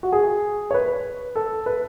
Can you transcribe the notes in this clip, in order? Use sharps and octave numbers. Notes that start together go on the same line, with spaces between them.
F#4
G#4
C#5
B4
A4
B4